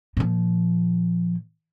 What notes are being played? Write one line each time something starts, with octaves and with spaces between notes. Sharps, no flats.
A#2 F3